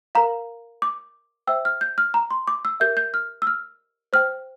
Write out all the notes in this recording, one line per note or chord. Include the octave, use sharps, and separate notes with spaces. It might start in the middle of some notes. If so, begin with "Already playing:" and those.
A#4 F5 A#5
D6
C5 E5 G5 E6
F6
G6
F6
A#5
C6
D6
E6
G4 A#4 E5 G6
G6
F6
E6
F6
C5 G5 F6